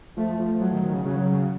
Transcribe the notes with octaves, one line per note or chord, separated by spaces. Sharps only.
F3 A3
F3
F3 F#3
D#3
D#3
C#3
C#3 F#3